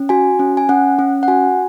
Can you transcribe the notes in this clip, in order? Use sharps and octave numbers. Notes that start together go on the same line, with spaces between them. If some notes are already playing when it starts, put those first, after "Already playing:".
Already playing: C#4
F#4 G#5
C#4
G#5
C#4 F#5
C#4
F#5
F#4 G#5